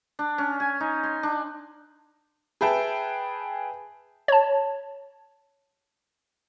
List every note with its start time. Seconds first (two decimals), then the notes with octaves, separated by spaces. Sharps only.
0.19 D4
0.38 C#4
0.60 G#5
0.80 D#4
1.03 C6
1.23 D4
2.61 G#4 B4 E5 G5 A5
4.28 C#5 A5